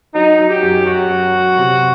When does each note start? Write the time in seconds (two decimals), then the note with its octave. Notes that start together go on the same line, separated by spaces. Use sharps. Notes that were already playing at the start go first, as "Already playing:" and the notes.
0.15 F#3 D#4
0.38 F#3
0.50 G4
0.63 F#2
0.86 F#3 F#4
1.10 F#2
1.34 F#3
1.58 C3